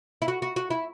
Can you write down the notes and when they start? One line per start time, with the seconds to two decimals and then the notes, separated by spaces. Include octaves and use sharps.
0.22 E4
0.28 F#4
0.42 F#4
0.56 F#4
0.70 E4